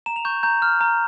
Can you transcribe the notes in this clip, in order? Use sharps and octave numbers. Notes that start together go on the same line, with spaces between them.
A#5 E7
F7
C#6 G6
A#5 G6
F6
A#5